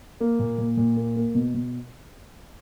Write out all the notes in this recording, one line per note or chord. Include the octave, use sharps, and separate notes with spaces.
A#3
A#2
A#2
A#2
A#3
A#3
B2
B2